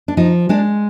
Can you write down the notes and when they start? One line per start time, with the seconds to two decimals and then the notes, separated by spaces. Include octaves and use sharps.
0.08 D4
0.17 F3 D#4
0.49 G#3 D4